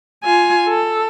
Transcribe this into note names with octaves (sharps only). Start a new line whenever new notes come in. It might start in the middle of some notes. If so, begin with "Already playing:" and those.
F4 G#5
A4